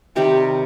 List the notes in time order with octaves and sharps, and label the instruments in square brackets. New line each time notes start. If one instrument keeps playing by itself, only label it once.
[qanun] C3 D#3 G3 [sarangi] G4